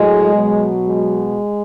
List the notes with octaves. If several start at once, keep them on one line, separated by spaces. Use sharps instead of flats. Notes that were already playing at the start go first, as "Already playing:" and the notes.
Already playing: A2 F#3 G#3
B2 F#3
G#3